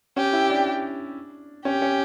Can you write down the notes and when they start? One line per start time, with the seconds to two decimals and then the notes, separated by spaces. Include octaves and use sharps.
0.17 C#4 G4
0.33 E4
0.49 D4
1.65 C#4 G4
1.82 C#4